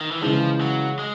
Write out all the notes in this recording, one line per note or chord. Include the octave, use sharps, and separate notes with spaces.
D#3
E3
C#3 E3 F3 G#3
F#3
G#3